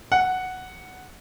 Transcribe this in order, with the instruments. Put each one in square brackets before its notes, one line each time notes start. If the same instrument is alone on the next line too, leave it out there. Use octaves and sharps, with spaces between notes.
[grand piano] F#5